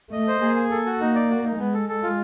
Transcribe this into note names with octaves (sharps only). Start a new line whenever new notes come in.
A3 D#5
C5
A#3 G#4
G#5
A4
F#4
A#3 D#4
D5
F#4
D#4
G#3 B3
A4
A4
F4